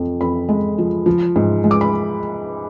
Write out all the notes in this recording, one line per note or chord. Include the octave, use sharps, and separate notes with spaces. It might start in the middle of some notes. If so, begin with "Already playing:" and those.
Already playing: F2 F3
F2 B5
G#3
F3
F3
G#2
G#3
D6
B5